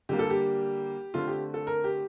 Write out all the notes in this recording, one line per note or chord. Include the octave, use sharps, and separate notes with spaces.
D3 G3 A#3 G4
A4
G4
D3 A3 C4 F4
G4
A4
A#4
G4